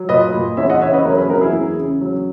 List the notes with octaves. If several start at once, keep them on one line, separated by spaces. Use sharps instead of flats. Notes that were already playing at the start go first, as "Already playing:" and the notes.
Already playing: F#3
A#2 B4 D#5
A#2
E2 C#5 E5
D#5 F#5
C#3 C#5 E5
B4 D#5
F#3 A#4 C#5
G#4 B4
E2 F#4 A#4
E4 G#4
E2
C#3
F#3